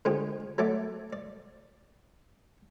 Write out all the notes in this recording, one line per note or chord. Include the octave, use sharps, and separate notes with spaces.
D3 G#3 F4 G4 G#4 C5
F#3 A3 D5 E5 A5 D6
D5